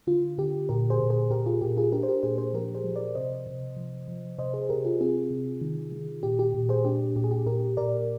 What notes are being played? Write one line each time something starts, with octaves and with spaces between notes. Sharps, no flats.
D3 F4
D3 G4
A#2 G4 A#4
G#4 C5
A#2
G#4 C5
A#2 G4 A#4
F4 G#4
A#2 G4
F4 G#4
D4 G4 A#4
C5
G4 A#4
A#2 G#4 C5
G#4 C5
F3 G4 A#4
G#4 C5
F3
A#4 D5
C3 C5 D#5
C3
F3
F3
C3 C5 D#5
G#4 C5
C3 G4 A#4
F4 G#4
C4 F4 G#4
C3
D#3
D#3
A#2 G4
G4
A#2
G#4 C5
D4 G4
A#2 G4
G#4
G4
A#2 G4 A#4
A#2 A#4 D5